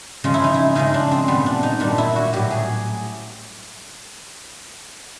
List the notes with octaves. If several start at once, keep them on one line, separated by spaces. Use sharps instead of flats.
C#3 F3 G#3 F4
E4
D#4
E4
C#3 F3 G#3 D#4
D4
C4
A#2 G3 B3
D4
D#4
A#2 G3 D4
E4
F#4
A2 F#3 G4
G#4